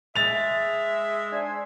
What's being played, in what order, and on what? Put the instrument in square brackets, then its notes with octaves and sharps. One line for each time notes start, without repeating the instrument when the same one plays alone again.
[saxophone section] G#3 [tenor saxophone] E5 [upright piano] A6 F7
[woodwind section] D4 C5 G#5